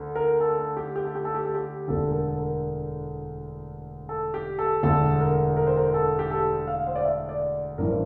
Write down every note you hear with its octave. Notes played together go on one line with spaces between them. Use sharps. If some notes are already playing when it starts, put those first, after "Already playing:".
Already playing: D2
A#4
A4
A4
G4
G4
A4
G4
A4
G4
A4
G4
E1 D2 D3 A4
A#4
A4
A4
A#4
A4
G4
A4
E1 D2 D3 A4
A#4
A#4
C5
A#4
A4
G4
A4
F5
C5
D5
E5
D5
A1 G2 E3 A#4
C5